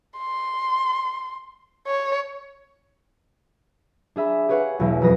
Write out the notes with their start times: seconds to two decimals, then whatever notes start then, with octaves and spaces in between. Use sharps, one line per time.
0.18 C6
1.87 C#5
4.16 D4 G#4 E5 B5
4.48 G4 G#4 B4 C#5 F5 F#5
4.79 E1 B1 E2 G#3 E4
5.01 E1 F2 F#3 B4 D#6 A#6